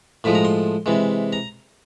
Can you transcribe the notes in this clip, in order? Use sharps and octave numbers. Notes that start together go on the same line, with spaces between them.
A2 F3 G#3 B5
A#5
C6
C3 E3 G#3
A#5